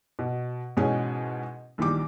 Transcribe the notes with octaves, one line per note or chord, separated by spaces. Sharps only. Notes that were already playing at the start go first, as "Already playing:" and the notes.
B2
G#2 B2 E3 C#4 G#4
A#1 D#3 E3 G3 D6